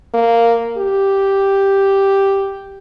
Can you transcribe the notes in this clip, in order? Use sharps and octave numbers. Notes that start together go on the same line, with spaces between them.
A#3
G4